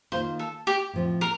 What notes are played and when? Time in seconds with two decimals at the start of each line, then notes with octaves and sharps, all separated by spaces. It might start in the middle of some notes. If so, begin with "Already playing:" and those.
0.12 D#3 A#3 F4 C5
0.39 A4
0.67 G4
0.93 A2 F3 C4
1.21 A#4